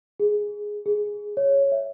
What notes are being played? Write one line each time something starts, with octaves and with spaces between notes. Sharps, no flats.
G#4
G#4
C#5
E5